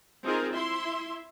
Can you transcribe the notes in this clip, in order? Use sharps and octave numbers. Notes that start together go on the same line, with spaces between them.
C4 D#4 F4 G#4 A#4
E4 E5 C6